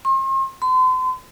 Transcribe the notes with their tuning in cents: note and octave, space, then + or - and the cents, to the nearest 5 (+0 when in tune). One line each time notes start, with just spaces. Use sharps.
C6 +40
C6 -40